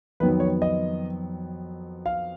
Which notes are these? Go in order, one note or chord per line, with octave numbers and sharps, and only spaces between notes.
F2 D#3 F#3 B3 B4
C#5
D#5
F5